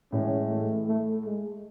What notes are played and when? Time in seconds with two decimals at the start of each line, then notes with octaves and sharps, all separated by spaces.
0.12 A2 E3 G#3 C#4
0.50 A3
0.87 A3
1.24 G#3